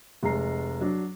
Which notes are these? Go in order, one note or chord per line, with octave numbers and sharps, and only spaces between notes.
F1 G#3 A#5 C7
F#3 D4